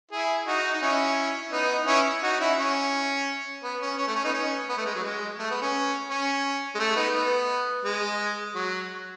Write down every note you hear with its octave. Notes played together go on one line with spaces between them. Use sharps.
E4 G#4
D#4 F#4
D#4
C#4 E4
B3 D#4
C#4 E4
D#4 F#4
C#4 E4
C#4
B3
C#4
C#4
A3
C#4
B3 D#4
C#4
B3
A3
G#3
F#3
G#3
A3
B3
C#4
C#4
G#3
A3
B3 D#4
B3
G#3
F#3